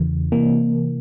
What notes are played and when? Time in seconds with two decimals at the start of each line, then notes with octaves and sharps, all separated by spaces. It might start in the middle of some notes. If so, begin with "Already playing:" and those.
Already playing: E2 C#3 E3
0.32 C3 E3 A#3